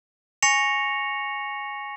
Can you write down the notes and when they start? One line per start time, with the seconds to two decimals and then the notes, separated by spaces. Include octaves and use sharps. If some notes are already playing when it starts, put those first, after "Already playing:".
0.42 G#5 C#6 A#6 C#7 F7